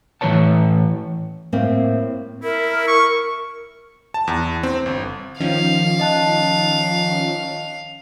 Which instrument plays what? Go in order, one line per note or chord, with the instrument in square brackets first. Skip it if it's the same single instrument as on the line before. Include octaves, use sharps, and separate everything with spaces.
[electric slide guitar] A2 E3 D#4 B4 C#5 A5
[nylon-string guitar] A2 A#3 C4
[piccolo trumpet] E4 [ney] A#4
[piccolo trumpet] C#6
[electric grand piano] A5
E2
C4
G1
[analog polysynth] D#3 F3 C#4 [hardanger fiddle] F5
[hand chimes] D#5 A5 F#6